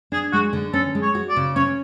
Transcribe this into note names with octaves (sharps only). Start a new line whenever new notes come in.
D4 G#4
G#3 F#4
D3
C#4 A4
G#3
C#5
F#4
D5
C#3
C#4 C#5